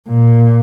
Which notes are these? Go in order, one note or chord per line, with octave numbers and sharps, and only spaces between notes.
A#2